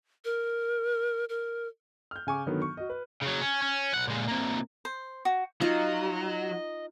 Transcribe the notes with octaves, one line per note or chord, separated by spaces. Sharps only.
A#4
A#4
F6 G6
C#3 G#5 C#6 D6
D3 D#3 F#3 B3
C#6
F#4 D#5
B4
C#3 F#3
C#4
C#4
B1 F#5
A#2 G#3
C3 A#3
C5
F#4
F#3 D#4 F4 D#5